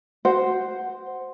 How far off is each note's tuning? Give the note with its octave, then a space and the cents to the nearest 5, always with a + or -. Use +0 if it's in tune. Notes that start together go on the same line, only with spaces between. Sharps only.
F#4 +5 C5 +0 F#5 +0